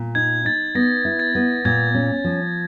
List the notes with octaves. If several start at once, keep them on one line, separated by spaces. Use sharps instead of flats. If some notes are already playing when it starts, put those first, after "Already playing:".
Already playing: A#2
D#4 G#6
D#4 A6
B3 A#6
E4
A6
B3
A#2 G#6
C#4
F3